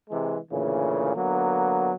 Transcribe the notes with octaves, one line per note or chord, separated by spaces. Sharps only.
C3 E3 G#3
D2 A#2 C#3 E3
D3 F#3 A#3 B3